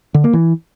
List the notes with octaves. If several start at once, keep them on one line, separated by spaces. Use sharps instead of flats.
D3
A#3
E3